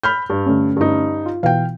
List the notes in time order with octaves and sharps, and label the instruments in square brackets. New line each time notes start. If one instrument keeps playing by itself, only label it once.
[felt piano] B5 F6 G6
G2
[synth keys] D3 A3 C#4
[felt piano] G2 D#4
[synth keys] F4
[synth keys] B2 E3 [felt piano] F5 G5